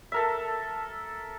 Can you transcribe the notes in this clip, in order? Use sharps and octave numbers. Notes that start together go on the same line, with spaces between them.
A4 A#4 E5